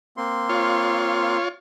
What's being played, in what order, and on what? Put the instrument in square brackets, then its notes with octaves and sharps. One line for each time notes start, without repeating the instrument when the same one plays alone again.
[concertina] A#3 C4 C6
[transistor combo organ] F4 C#5